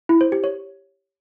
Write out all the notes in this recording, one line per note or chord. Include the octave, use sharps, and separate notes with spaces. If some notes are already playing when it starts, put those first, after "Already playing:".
E4
C5
G4
C#5